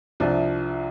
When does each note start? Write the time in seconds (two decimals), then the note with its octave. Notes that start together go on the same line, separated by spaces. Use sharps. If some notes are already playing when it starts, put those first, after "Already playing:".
0.20 C2 C3 F3 D4